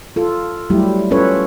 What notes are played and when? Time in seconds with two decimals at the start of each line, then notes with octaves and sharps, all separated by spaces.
0.16 F4 A4
0.70 F#3 G3 A3 E4 G4
1.11 C#4 F4 A4 B4 C#5